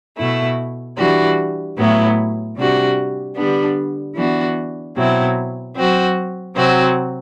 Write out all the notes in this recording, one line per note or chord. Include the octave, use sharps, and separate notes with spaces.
B2 A3 E4
E3 G3 D4 F#4
A2 F#3 B3 E4
C3 G3 D4 F#4
D3 G3 B3 D4
E3 B3 D4 F#4
B2 F#3 C4 E4
F#3 C4 F#4
C3 F#3 C4 F#4